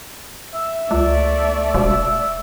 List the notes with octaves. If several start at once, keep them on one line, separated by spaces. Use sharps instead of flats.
E5
C#2 A3 D5
E1